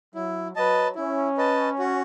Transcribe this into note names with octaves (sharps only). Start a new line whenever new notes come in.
F#3 E4
F#3 B4 D#5 A5
C#4 E4
B4 D#5 A5
F#4